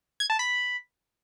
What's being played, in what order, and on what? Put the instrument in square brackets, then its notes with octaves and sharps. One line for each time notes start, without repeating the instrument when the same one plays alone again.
[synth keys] G#6
A5
B5